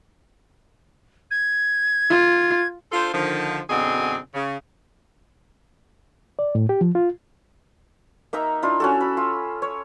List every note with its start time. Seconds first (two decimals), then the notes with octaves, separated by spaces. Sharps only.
1.30 G#6
2.09 F4
2.92 D4 F4 A4 C5
3.12 D3 D#3 F3
3.68 F#2 B2 D3 C4 D#4 G#4
4.34 C#3
6.39 D5
6.55 A2
6.69 G4
6.81 F3
6.95 F4
8.33 A#3 D#4 E5 A#5
8.62 D4 E4 F4
8.80 C#4 F#4 A4
9.01 B5
9.17 F4
9.62 C#5